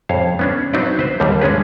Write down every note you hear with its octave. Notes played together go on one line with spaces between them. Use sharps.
F2 C#5 F5
B3 C#4 D4
F#3 C4 D4 D#4 B4 D5
B4 C5
D#2 D3 G3
G#3 C#4 D4 G#4 B4